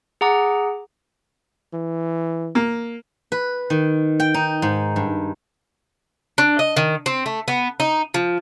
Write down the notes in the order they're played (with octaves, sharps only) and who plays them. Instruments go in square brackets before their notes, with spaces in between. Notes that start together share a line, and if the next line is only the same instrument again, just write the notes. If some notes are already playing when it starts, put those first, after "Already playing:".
[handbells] G#4 F#5 A#5 D6
[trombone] E3
[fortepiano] A#3
[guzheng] B4
D#3
G5
D#4
G#2
G2
[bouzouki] D4
D#5
D#3
C4
A3
B3
D#4
F3